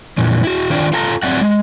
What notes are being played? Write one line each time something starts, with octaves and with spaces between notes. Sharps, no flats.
F2 A#2 E3
E4 F#4
D#3 D4 F4 C5 D5 G5
F4 A4 A5 A#5
F#3 C4 D5 E5 F#5
G#3